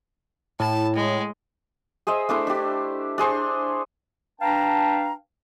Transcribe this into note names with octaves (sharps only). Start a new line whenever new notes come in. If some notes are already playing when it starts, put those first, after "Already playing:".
A2 A5
G#3
G#4 C5 D#5 E5
A3 D4 E4 C5
D4 G4
D4 G#4 C5 C#6
D4 B4 F5 G5 A5 A#5